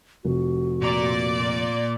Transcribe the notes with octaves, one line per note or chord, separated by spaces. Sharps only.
F1 F#4
A#2 D5 A#5